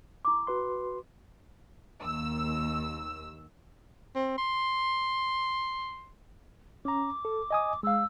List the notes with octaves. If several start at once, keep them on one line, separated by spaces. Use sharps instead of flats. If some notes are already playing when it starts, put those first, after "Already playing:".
E4 D6
F#4 B4 C6
D#2 E6
C4
C6
C#4 A#5 D6
A4
D#5 G#5 D#6
G#3 F5 E6